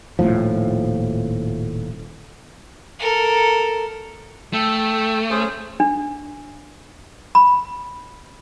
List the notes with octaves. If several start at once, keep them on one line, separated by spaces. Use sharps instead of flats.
D#1 C2 A2 F3
A4 A#4
A3 A4 G5
C#4 G#4 C5
D4
B5